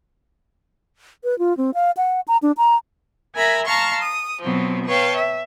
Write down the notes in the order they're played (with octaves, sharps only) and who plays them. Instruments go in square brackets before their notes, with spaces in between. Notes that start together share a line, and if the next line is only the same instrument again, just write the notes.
[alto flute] B4
F4
C4
F5
F#5
A#5
D4
A#5
[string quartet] A#4 E5 G#5 A#5 B5
F5 A5 A#5 C6 C#6 F6
D#6
B2 F3 F#3 C4
B4 C#5 F5 G5 A5
E5